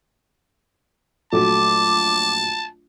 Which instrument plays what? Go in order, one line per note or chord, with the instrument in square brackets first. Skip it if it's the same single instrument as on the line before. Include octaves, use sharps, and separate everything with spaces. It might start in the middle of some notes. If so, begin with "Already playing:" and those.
[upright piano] A#1 F#3 A3 [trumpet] A5 [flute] D6